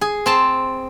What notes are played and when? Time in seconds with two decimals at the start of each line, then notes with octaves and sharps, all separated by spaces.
0.01 G#4
0.26 C4 A5 C6